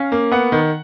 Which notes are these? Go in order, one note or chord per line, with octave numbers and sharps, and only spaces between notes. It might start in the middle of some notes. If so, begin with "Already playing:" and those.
Already playing: C#4 F5
A#3
B3 F#5
D#3